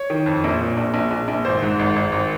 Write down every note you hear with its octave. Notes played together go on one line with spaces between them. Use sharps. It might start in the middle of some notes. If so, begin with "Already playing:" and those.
Already playing: C#5
D#3
F2
A#1
A#2
A#1
A#1
A#1
A#1
G#1 C5
G#2
G#1
G#1
G#1